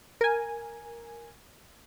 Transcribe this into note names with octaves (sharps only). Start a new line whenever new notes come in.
A#4 G#5